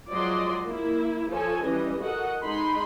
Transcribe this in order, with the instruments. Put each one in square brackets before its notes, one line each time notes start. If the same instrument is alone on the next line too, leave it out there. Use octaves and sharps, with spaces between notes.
[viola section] F3 F#3 G#3 D5 D#5 C6
A#3 E4
F3 A4 C#5 G#5
E3 G3 C#4 D#5
F#4 A4 A#4 D#5 F#5
G#3 D#4 B5 C6